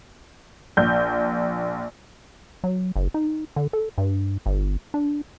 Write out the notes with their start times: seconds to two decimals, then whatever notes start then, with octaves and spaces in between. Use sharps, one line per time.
0.77 A#1 G6
2.64 F#3
2.96 F#1
3.14 D#4
3.56 D3
3.73 A4
3.98 G2
4.46 G1
4.94 D4